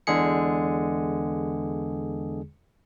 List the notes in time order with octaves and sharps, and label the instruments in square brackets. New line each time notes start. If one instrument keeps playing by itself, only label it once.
[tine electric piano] E2 D3 G#3 G#4 C#7